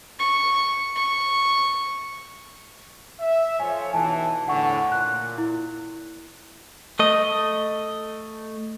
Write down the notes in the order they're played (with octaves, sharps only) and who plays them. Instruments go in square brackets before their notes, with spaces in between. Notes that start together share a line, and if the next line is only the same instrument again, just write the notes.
[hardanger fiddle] C#6
C#6
[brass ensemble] E5
[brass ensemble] F3 A4 C#5 [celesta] G#5
[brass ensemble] B1 E3 [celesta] G#5 A5
[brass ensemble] E2 A2 D3 [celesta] F#5 C#6
[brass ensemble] A#2 [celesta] F#6
[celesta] E4
[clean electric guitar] A3 D#5